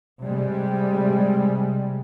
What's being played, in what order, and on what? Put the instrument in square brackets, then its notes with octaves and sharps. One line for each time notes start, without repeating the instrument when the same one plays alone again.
[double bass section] C3 G3 G#3